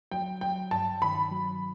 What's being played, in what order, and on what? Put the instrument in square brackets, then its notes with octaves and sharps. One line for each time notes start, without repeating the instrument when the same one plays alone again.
[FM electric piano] F#3 [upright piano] G5
[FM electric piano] F#3 [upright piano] G5
[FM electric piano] G2 [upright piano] A5
[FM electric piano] D#3 [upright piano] B5
[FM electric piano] F#3